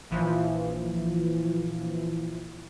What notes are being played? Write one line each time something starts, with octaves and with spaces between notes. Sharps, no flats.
A#1 E3 F3